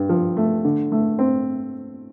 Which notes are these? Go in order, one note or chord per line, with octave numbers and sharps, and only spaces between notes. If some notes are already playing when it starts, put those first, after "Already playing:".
Already playing: G2
F3
A3
D3
A3
C4